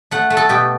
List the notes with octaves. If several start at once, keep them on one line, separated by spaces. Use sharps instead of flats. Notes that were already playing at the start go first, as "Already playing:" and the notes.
A3 F#5
A3
A4
B2 G4